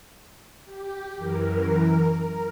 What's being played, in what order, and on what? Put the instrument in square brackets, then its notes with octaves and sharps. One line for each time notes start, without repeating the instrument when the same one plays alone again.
[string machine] G4
F#2 E3 A#4
A#4